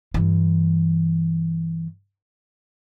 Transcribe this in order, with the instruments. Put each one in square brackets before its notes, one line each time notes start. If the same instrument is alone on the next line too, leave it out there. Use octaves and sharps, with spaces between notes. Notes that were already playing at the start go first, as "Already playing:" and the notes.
[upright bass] G2 E3